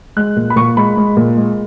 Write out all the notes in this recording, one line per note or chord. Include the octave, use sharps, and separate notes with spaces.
G#3 F#6
A#2
B5
A#2 C#6
G#3 B5
G#3
A#2
G#3